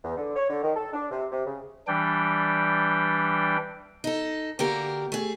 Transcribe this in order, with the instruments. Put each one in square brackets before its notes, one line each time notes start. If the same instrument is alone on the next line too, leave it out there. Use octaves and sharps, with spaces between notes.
[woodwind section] E2
D3
C#5
D3
D#3
A4
D4
C3
C3
C#3
[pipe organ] E3 G3 D4 G5
[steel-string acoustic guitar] D#4 A4
D3 A#3 F#4 G4 A#4
A3 G#4